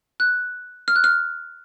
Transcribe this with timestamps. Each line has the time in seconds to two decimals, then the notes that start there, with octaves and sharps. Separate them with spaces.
0.20 F#6
0.88 F6
0.96 F#6
1.04 F6